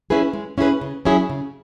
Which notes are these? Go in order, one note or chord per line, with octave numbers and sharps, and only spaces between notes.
C#4 E4 G#4 B4
G#3
C#4 E4 G#4 B4
C#3
F#3 C#4 E4 G#4
C#3